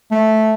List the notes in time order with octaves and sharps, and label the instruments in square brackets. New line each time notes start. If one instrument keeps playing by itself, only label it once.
[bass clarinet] A3